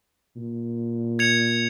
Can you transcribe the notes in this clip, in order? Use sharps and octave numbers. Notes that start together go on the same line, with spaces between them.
A#2
G#6 C#7 F7